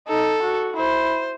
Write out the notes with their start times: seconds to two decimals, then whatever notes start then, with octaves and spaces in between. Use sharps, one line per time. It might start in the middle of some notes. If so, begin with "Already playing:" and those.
0.08 D#4 A4
0.43 F#4
0.76 E4 C5